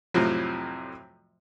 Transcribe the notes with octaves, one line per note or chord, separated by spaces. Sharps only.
F2 A2 C3 F3 F#3